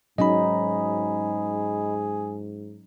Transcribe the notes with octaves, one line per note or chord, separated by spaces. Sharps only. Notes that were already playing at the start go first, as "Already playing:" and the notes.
G#2 F#3 C#4 D#4 G#4 D#5 B5